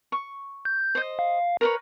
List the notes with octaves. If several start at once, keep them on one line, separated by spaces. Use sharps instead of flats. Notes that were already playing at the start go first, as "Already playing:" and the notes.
C#6
G6
C5 D#5
F5
A#4 B4 C#5